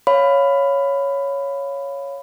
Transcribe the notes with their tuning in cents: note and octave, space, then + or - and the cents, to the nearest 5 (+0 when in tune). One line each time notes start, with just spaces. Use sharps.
C#5 +0 F5 +0 B5 +15